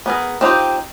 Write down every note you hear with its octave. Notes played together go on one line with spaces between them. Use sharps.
B3 G#4 A#4
C4 D#4 F4 G4